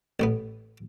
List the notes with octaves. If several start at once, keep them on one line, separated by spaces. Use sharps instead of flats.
A1 A2 B3